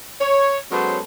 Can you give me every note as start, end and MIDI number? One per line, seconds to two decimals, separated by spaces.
0.21 0.59 73
0.71 1.00 54
0.71 1.00 56
0.71 1.00 59
0.71 1.00 61
0.71 1.00 69
0.71 1.00 72